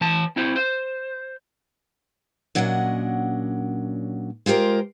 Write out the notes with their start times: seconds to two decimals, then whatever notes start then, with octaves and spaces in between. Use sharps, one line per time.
0.01 E3 A5
0.36 C4 E4 C5
0.56 C5
2.55 A#2 F#3 C#4 D4 D#5 F#5
4.46 G#3 F4 G4 A#4 C5